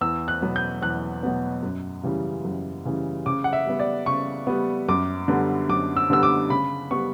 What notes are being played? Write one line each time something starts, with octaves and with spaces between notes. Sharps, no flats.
E2 E6
F#6
B2 F#3 B3
G6
E2 F#6
B2 F#3 B3
F#2
C#3 E3 G3
F#2
C#3 E3 G3
C#3 D6
F#5
E5
G3 B3
D5
C#3 C#6
G3 B3
F#2 D6
D3 G3 B3
F#2 D6
E6
D3 G3 B3 E6
D6
C#3 B5
G3 B3 C#6